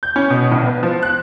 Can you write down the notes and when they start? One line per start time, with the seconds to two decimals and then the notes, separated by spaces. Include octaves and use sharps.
0.03 G6
0.16 C#4
0.30 B2
0.52 A#1
0.66 B3
0.83 F3
1.03 F#6